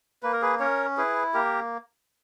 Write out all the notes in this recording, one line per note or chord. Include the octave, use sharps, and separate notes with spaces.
A#3 B4
A#4
G#4 B4
C#4 A#4 C#5
E4 G#4 B4
A#3 G4 A#4